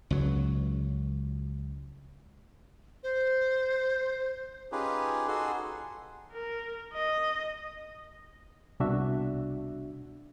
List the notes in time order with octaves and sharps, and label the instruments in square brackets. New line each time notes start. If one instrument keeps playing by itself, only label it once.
[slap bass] C#2 F#3
[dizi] C5
[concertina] C#4 D#4 F4 G4 G#4 B4
D#4 F#4 G#4 A4 C6
[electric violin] A#4
D#5
[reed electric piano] C2 B2 D4 F#4 E5